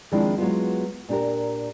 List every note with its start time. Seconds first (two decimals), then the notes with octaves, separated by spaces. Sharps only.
0.12 D#3 F3 G#3 C4 D4 E4
0.38 F#3 G#3 B3 F4
1.09 A#2 D4 G4 A#4